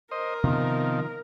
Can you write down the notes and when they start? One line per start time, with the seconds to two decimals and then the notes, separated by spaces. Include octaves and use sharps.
0.11 A#4 C5 D#5
0.44 C3 D#3 F3 B3